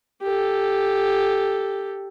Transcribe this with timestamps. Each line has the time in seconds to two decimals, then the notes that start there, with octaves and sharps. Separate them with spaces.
0.22 G4 A4